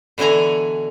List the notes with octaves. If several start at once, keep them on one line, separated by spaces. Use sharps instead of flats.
B2 D3 E3 G#5 A#5